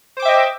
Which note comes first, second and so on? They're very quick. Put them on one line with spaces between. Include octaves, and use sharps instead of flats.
C5 D6 G5 E5 D#5